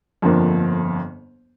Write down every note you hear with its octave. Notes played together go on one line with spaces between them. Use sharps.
G1 F2 D3 F3 A#3